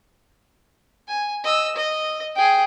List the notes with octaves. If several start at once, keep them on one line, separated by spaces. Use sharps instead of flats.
G#5
D#5 E6
D#5
G#4 G5